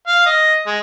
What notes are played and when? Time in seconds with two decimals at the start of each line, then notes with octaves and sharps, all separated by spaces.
0.07 F5
0.26 D#5
0.67 G#3